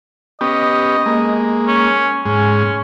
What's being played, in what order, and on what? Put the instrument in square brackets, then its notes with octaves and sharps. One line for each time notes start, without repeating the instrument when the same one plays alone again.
[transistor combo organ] B3 C#4 G4 [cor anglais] D#5
[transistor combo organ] G#3 A#3
[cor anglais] C#4
[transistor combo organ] G#2 G#3 [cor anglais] C#4